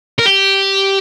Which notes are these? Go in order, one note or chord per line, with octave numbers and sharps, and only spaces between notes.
A#4
G4